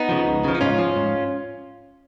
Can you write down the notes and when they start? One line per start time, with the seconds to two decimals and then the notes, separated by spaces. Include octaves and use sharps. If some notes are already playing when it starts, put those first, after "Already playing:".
Already playing: B3 D#4
0.09 C#3 F3
0.26 C#2
0.44 C#3 F3
0.55 D#4
0.61 G#2 C#4 F4
0.79 F3
0.96 G#2